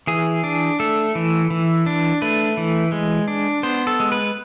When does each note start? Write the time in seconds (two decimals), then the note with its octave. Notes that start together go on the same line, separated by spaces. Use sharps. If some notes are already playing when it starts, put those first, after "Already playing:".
0.07 E3 G#4
0.44 D4
0.80 A3 A4
1.15 E3
1.50 E3
1.86 D4
2.22 A3 B4
2.57 E3
2.92 G#3
3.28 D4
3.63 B3 C5
3.87 A4
4.00 G#3
4.12 B4